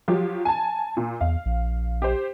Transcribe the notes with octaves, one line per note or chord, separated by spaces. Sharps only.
F3 F#3 G4
G#5 A5
A#2
E2 F5
A#1
G4 C5